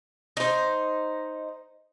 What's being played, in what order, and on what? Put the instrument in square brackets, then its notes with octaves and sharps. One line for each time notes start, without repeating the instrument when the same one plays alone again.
[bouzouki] D#4 C5